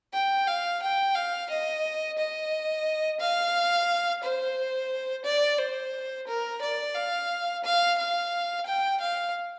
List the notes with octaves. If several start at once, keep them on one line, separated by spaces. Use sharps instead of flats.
G5
F5
G5
F5
D#5
D#5
F5
C5
D5
C5
A#4
D5
F5
F5
F5
G5
F5